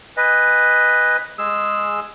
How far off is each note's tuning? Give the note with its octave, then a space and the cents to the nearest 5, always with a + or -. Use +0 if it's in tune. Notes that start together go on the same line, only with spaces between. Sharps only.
B4 +0 D#5 +0 G#5 -30
G#3 +0 G#4 +0 E6 +0